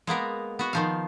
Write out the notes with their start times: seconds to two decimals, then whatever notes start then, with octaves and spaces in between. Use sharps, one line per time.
0.07 G#3 A#3 B3 A#4
0.59 B3 F#4
0.73 D#3 F3 F5